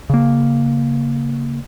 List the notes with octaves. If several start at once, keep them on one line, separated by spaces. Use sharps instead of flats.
C#3 A#3